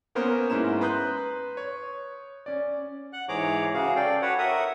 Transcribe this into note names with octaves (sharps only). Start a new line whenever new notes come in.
A#3 B3 C#4 A#4 C5
G#2 C#4 E4 A#5 E7
B4 A#5 C6 D#6 F#6 G6
C#5
C#4 D5
F#5 F#6
G#2 E3 G#4 C#5 A#5 D6
C#3 F#4 G#4 F5
A4 D5 F5 G5
F#4 B4 C#5 F#5
A#4 E5 F#5 D#6